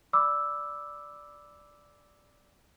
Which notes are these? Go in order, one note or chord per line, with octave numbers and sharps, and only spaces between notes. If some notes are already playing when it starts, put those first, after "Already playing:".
D5 B5 D6 E6